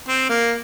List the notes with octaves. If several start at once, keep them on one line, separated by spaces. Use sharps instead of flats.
C4
A#3